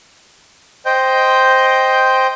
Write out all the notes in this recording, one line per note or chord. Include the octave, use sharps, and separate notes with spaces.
C5 D#5 G5 G6